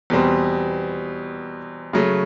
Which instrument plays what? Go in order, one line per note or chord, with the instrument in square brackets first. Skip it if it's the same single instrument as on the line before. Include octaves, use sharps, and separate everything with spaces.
[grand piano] E2 B2 G3 C4
C#3 F#3 A3